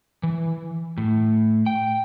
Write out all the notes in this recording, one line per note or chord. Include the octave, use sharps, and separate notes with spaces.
E3
A2
G5